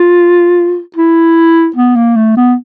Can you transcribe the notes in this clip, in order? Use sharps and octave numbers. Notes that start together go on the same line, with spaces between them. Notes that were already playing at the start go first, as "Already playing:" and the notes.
Already playing: F4
E4
B3
A#3
A3
B3